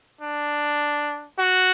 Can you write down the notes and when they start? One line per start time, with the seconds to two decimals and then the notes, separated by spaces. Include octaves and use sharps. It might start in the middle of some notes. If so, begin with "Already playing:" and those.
0.21 D4
1.38 F#4